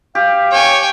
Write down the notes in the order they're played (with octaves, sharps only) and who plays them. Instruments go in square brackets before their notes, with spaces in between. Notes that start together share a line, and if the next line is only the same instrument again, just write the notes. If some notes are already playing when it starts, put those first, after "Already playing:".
[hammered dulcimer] G4 [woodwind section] F5
[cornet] C#5 [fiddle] G5 G#5